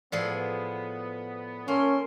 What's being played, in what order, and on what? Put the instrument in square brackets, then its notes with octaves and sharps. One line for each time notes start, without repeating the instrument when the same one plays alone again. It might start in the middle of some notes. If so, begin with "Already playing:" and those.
[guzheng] A2 F3 G#4 [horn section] B3 [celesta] D5
[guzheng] A#3 [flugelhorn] C#4 [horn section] A4 C6